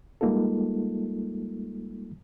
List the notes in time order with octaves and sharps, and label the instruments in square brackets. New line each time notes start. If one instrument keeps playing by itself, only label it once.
[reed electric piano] G3 G#3 A#3 D#4 F4 A4